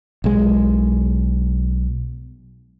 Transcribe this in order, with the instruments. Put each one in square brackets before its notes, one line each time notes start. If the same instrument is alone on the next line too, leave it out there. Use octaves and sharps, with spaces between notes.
[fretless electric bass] B1 G#3